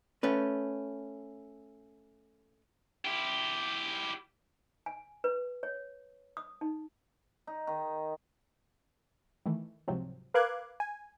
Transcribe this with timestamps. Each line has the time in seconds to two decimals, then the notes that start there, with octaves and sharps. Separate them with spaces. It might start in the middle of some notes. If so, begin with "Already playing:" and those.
0.23 A3 C#4 B4
3.05 E4 G4
4.86 G#5
5.24 B4
5.63 C#5
6.37 D#6
6.61 D#4
7.47 D#4
7.67 D#3
9.46 D#3 E3 A3
9.88 C#2 G#2 C3 F3 F#3 C4
10.34 A#4 B4 F5 D6 F#6 G#6
10.80 G#5